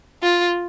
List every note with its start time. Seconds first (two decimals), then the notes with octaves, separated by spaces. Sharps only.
0.23 F4